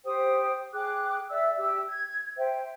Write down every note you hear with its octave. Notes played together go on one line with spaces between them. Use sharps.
G4 C5 G5 D#6
G#4 G5 D6 F#6
D5 E5 E6
G4 E6
G#6
C5 E5 G5